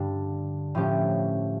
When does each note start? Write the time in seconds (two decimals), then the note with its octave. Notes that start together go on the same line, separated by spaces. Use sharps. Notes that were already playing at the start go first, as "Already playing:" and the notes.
Already playing: G2 D3 G3 D4
0.75 A2 F3 C#4 G4